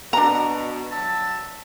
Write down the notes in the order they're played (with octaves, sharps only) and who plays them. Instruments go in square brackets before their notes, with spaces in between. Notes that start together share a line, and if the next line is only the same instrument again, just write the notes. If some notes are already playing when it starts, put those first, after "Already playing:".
[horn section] B2 [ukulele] D4 A#5
[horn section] F#3 E5 A5